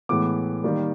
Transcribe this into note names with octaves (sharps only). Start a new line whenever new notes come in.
A2 E3 G#3 B3 D6
D#3 G3 A#3